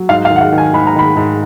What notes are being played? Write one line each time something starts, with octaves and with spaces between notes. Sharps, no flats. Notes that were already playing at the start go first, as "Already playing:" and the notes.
Already playing: F#3
G#2 F5
F5
D#3
F#5
F5
D#3
G#5
G#2 B5
A#5
D#3 B5
G#2